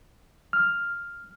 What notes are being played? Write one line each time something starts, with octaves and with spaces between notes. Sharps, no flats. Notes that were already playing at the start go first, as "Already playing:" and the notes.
F6